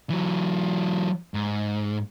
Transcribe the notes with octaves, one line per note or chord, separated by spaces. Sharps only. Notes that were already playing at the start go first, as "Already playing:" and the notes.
E3 F#3
G#2